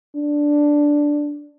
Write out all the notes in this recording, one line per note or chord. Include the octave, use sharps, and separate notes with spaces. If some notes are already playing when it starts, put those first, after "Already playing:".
D4